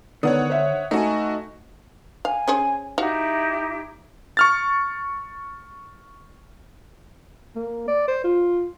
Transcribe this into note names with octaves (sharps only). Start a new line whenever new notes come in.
D3 D#3 B3 C#5 D5 F#5 D#6
C5 E5
A3 D#4 F#4 C5 D#5 G#5
F5 G#5
C#4 G#4 C5
D#4 E4 F#4 G4 F5
C#6 F6 A6
A#3
D5
C5
F4